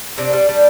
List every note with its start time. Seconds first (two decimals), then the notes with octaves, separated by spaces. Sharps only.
0.18 C3 D4
0.33 G3
0.49 G3